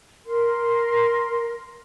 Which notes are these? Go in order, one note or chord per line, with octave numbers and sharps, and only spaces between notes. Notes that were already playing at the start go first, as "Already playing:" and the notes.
A#4 C6